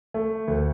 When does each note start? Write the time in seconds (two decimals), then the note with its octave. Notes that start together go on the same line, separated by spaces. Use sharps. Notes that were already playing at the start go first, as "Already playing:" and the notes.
0.14 A3
0.48 D2